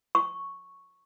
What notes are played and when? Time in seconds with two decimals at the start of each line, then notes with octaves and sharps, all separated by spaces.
0.15 C#6